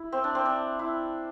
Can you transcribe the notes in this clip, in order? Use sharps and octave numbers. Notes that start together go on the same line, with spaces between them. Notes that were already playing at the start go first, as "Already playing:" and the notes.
Already playing: E4
C4
D4
C4
D4
E4